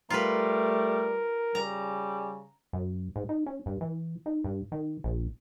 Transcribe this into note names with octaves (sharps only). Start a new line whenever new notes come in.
G3 A3 F4 A#4 B4
C#3 G3 A#5
F#2
G#2
D#4
C#4
G2
E3
D#4
G2
D#3
A#1